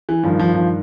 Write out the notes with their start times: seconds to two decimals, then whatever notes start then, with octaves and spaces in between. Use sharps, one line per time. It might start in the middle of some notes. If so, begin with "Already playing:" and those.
0.09 E3
0.23 G2 D#3 F3
0.39 F3
0.54 F3